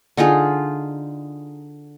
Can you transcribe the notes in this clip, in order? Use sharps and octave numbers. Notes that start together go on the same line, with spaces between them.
D3 D#4 F4 G#4